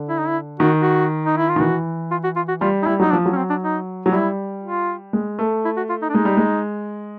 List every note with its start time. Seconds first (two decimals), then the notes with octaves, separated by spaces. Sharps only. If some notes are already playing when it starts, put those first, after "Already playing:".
Already playing: D3
0.09 E4
0.19 D#4
0.28 E4
0.60 D#3 F#4
0.82 F#4
1.25 D#4
1.37 E4
1.49 F4
1.56 D#3
1.60 E3 F#4
2.11 F4
2.24 F#4
2.36 F4
2.48 F#4
2.61 G3 F4
2.82 D#4
2.86 G3 E4
3.00 F#3 D#4
3.11 F3 D4
3.26 F#3
3.33 C#4
3.37 C4
3.50 D4
3.62 D#4
4.06 F#3
4.12 G3 E4
4.63 F4
5.13 G#3
5.39 A3
5.65 E4
5.77 F#4
5.89 F4
6.02 D#4
6.09 D4
6.14 G#3 D#4
6.25 G3
6.37 G#3